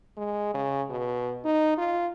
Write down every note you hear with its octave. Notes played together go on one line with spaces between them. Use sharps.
G#3
C#3
B2
D#4
F4